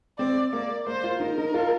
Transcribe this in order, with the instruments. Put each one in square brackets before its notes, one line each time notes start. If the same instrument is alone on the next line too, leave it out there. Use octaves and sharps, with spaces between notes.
[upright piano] C4 [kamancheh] D5
[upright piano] A#3 [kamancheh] D5
[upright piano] A#3 [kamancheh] C5
[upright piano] F4
[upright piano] D#4 [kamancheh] A#4
[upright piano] D#4
F4